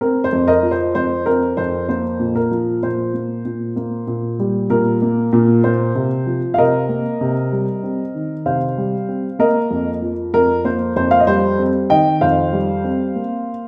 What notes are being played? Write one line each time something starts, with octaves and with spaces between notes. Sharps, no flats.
C4 A#4
C5
F2
A#4 D#5
F3
C5
F2 C5
C4 A#4
F2 C5
A#3 C5
A#2
A#4
F3
A#2 C5
A#3
A#2
A#3
A#2
G3
A#2 A#4
A#3
A#2
A#3 C5
C3
F3
F5
C3 A#4 D#5
A#3
C3
G3
C4
D#3
C3 C5 F5
G3
C4
A#3 A#4 D#5
F2
F3
F2 A#4
A#3 C5
F2 C5
F5
D#5
G3 C5
C4
D#3 D#5 G5
F2 C5 F5
G3
C4
A#3